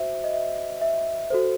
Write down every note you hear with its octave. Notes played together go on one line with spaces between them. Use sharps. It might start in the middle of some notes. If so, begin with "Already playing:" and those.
Already playing: F#4 C5 E5
D#5
E5
E5
F#4 A4 C5